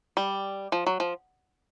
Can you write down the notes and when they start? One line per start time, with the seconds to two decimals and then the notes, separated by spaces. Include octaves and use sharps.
0.17 G3
0.72 F3
0.86 F#3
1.00 F3